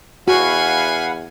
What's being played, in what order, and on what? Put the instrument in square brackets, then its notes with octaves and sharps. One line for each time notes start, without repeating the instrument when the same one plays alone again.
[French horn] E2 [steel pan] F#4 [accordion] F5 F#5 B5 [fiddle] G#5